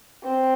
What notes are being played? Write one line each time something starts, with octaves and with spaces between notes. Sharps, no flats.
C4